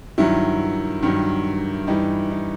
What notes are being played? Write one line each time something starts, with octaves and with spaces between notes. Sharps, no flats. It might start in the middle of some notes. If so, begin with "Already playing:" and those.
G2 D#3 F#3 E4
G2 D#3 F#3
G2 E3 G3 D#4
D#4